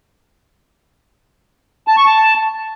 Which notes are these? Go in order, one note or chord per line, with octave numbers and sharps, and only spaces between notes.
A5
C#6
A5